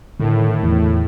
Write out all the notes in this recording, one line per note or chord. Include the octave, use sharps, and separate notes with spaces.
A2 D3 D#3
E2